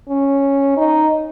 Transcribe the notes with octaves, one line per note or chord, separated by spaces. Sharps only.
C#4
D#4